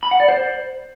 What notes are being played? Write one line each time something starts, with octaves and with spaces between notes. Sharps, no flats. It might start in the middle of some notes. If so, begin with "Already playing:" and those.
B5
F#5
D5
C5